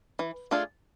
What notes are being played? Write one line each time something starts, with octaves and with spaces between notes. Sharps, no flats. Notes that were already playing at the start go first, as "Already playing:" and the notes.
E3
A3 D4 F4 G#4